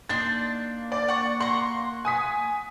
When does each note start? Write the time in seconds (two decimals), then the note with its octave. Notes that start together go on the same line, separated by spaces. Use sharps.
0.09 A#3 D4 D#4 C6 A6
0.92 D5
1.08 F#5 C#6
1.40 F#5 A#5 C6 C#6
2.05 G#5 D#6 B6